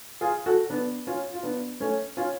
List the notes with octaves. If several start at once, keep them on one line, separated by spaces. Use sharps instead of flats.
F4 G#4
F#4 A4
B3 D4
C#4 F4
F4
B3 D4
A3 C#4
C#4 F4